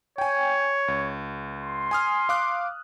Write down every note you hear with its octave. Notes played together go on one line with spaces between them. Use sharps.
C#5 G5 G#5
C#2
C6
G#5 D#6 F6
F5 D6 F#6